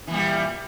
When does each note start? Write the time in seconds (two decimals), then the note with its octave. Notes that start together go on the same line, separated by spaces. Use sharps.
0.07 E3
0.11 A#2
0.14 G3